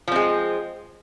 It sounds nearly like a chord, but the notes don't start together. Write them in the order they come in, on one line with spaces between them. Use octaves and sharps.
F3 C4 G#3